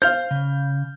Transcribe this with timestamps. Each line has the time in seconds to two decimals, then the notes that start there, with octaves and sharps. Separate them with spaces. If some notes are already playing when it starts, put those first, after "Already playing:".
0.02 C5 F5 F6 G6
0.31 C#3